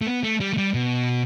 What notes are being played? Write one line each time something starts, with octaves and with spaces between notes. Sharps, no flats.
A3
B3
A3
G3
A3
G3
B2